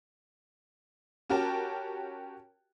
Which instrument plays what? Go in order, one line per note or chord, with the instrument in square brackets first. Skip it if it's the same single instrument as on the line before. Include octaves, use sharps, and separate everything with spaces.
[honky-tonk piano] C#4 F#4 G4 A#4 G5 A5